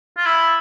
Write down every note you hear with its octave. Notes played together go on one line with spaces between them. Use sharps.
F4
E4